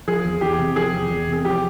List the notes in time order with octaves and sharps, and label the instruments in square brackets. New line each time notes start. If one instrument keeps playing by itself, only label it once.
[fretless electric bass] F3 [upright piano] G#4
[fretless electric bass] E2
[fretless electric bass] E2 [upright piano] G4
[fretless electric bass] C3
[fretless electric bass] F3 [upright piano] G#4
[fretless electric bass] E2
E2
[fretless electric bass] C3 [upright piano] G#4
[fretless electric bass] F3 [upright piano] G4